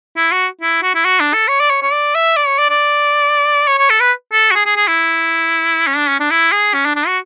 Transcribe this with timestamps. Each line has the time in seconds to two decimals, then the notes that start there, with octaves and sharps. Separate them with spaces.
0.17 E4
0.32 F#4
0.61 E4
0.83 F#4
0.95 E4
1.05 F#4
1.20 D4
1.33 A4
1.48 C#5
1.60 D5
1.70 C#5
1.82 C#5
1.93 D5
2.15 E5
2.37 D5
2.47 C#5
2.58 D5
2.69 D5
3.68 C#5
3.78 C#5
3.90 A4
4.00 B4
4.33 A4
4.51 F#4
4.55 G#4
4.66 G#4
4.76 G#4
4.87 E4
5.87 C#4
5.97 D4
6.08 C#4
6.20 D4
6.31 E4
6.52 G#4
6.74 C#4
6.85 D4
6.96 D4
7.07 F#4